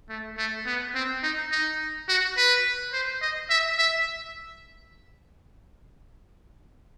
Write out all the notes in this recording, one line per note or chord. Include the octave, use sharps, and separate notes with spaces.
A3
A3
B3
C4
D#4
D#4
F#4
B4
C5
D#5
E5
E5